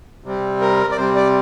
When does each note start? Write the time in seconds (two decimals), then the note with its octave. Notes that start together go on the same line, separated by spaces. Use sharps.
0.24 C3 G3 C4
0.61 A#4
0.91 D5
0.97 C3 G3 C4 C5
1.15 D5